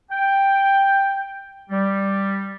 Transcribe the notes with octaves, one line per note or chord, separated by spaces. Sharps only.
G5
G3